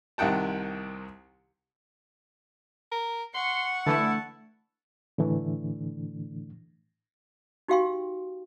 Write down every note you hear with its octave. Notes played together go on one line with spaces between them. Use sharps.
C2 C3 D#3 F#5 G5 A5
A#4
F#5 C6 C#6
D3 E3 A3 E4 A5
A2 D3 E3 A3 D4
D#4 F#4 G4 F5 G5 C6